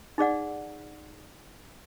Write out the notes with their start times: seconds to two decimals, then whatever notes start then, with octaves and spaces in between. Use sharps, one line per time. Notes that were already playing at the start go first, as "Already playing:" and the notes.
0.18 D#4 G#4 D5 F#5